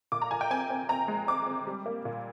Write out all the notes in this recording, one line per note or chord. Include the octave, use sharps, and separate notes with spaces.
A#2 D6
A#5
A#2 G#5
G5
C4 G#5
C4
C4 A#5
G#3
C4 D6
C4
G3
A#3
A#2